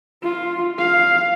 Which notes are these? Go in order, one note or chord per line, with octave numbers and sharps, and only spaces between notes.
F4
F5